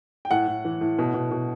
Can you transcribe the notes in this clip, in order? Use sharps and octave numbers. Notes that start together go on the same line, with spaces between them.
G5
A2 F#5
A2
E3
A2
B2
B2
B2